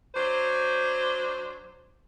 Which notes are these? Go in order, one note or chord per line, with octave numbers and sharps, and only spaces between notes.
F#3 D4 C5